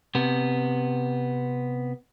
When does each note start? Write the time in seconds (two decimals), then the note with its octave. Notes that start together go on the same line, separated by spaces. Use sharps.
0.15 C3 B3